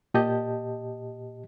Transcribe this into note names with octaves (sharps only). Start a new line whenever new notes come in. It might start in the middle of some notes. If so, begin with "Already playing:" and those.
A#2 G4 D#5 A5 G6